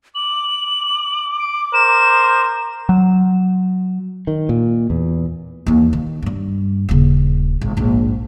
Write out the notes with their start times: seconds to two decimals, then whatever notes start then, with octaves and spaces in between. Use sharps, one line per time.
0.15 D6 F#7
1.39 D7
1.74 A#4 C5 E7
2.89 F#3
4.27 D#3
4.49 A#2
4.90 E2
5.66 D#2 E3
5.93 D#3
6.22 G2 G3
6.89 D#1 C#3
7.61 G#1
7.77 A#1 G#2